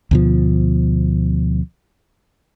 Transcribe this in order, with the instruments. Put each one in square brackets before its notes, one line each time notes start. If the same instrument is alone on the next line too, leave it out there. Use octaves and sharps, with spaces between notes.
[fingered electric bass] D2 B2 F3